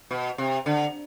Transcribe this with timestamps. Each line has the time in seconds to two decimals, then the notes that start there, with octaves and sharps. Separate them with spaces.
0.11 B2
0.38 C3
0.66 D3